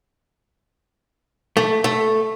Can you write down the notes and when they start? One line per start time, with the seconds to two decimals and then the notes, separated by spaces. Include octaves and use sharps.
1.57 A3
1.84 A3